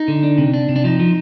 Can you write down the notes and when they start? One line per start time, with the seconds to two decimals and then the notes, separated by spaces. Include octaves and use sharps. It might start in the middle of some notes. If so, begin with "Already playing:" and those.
Already playing: D#4
0.08 D3
0.23 D4
0.38 C3
0.54 D4
0.69 C3
0.76 D4
0.84 F3 D#4
1.00 F3